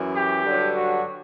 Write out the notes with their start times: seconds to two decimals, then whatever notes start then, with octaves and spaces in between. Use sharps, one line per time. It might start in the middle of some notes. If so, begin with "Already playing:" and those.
Already playing: F#2 E3
0.14 G4
0.44 G2 D3 F#3
0.75 F#4